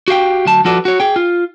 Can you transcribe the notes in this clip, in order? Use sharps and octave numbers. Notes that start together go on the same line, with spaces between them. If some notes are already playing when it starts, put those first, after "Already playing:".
F#4 G4 F5 G5
D2 F#3 A5
F3 F4 F#4 A4 B4 D5
F#4 C#5
G#4 G5
F4